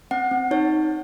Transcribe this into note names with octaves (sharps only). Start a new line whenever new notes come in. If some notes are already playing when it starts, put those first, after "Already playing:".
C4 F#5
C4
D#4 C#5